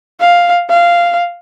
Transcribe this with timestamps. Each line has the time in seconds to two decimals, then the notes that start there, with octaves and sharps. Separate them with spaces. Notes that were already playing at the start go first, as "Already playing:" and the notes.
0.20 F5
0.70 F5